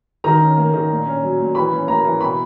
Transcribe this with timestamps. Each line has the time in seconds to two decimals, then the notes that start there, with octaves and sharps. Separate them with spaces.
0.24 D#3 A#5
0.40 C#4
0.57 A#3
0.74 D#3
0.90 A#2
1.05 C#4
1.23 F#3
1.39 A#2
1.55 E3 B5
1.72 C#4
1.87 A#3 A#5
2.04 E3
2.21 B2 B5